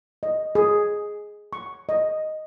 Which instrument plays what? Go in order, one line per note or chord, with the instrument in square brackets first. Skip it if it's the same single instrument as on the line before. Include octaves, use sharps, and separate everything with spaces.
[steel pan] D#5
G#4
C#6
D#5